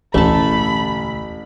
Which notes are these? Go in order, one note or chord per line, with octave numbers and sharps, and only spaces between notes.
E1 A1 D2 A3 A5 B5